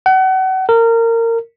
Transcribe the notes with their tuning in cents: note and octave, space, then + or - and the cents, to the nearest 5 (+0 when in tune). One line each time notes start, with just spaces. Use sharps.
F#5 +35
A#4 -25